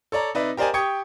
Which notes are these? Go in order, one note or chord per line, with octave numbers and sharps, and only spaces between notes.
A4 C#5 D5 A#5
C3 D#4 B4 D5 E5
G4 A#4 C5 D5 D#5 G#5
G4 G5 C#6 D#6 G#6 C#7